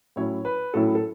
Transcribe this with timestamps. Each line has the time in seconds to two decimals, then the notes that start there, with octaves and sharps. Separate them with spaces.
0.16 A2 F#3 C#4 E4 C#5
0.45 B4
0.74 A2 F#3 C#4 E4 A4
0.95 A4